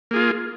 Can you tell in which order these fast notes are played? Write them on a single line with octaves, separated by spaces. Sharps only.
A#3 G#4 F4